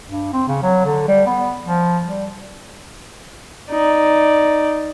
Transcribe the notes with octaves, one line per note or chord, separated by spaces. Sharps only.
G2
C4
C#3
F#3
D3
G3
B3
F3
G3
D#4 D5